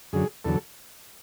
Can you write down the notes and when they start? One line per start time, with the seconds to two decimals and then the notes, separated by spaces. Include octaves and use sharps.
0.13 F#2 D3 F#3 G#4
0.45 E2 D3 F#3 A4